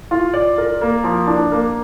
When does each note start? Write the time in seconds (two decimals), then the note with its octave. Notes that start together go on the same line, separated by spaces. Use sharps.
0.11 F4
0.34 D5
0.58 A#4
0.82 A#3
1.04 F3
1.27 D4
1.52 A#3